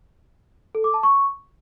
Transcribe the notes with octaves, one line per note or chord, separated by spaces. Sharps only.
A4
D6
A5
C#6